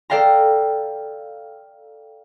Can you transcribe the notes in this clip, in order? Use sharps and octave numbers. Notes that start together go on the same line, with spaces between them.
A4 D5 F5 G5 A#5